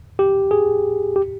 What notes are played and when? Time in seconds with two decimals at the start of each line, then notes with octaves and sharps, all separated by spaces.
0.19 G4
0.51 G#4
1.16 G4